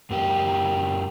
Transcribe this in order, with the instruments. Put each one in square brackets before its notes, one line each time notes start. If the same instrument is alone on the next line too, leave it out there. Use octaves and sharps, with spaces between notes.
[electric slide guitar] F#2 A#3 G4